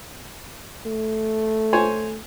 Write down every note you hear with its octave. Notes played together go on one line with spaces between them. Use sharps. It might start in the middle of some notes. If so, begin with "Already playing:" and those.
A3
C5 C#5 G#5